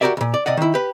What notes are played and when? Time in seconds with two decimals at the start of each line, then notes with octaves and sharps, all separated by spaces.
0.01 F#4 G4 A4 A#4 D5 E5
0.17 C#2 A#2
0.34 D5
0.46 C3 D5 D#5 F#5
0.57 D#3 E4
0.74 G4 B4